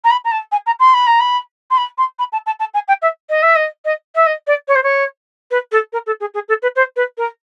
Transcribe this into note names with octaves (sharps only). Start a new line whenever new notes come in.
A#5
B5
A#5
A5
G#5
A#5
C6
B5
A#5
B5
C6
B5
C6
B5
A5
A5
A5
G#5
G5
E5
D#5
E5
D#5
D#5
E5
D#5
D5
C#5
C5
C#5
B4
A4
A#4
A4
G#4
G#4
A4
B4
C5
B4
A#4